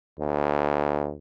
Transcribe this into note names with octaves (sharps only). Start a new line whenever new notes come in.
D2